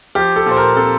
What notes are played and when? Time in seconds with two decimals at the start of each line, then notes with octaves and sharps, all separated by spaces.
0.15 F3 G4
0.36 A4
0.46 A#2 C5
0.57 A#4
0.77 C4 A4